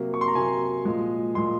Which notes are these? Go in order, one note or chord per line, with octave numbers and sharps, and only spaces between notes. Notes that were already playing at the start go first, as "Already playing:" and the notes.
Already playing: C3 F#3 A#3
C#6
C6
A#5
C3 F#3 A#3 G#5
A#2 F3 G#3
A#2 F3 G#3 C6